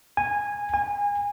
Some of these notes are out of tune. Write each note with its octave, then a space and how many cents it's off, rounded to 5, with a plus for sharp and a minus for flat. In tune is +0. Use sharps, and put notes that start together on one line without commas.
G#5 -15
G#5 -30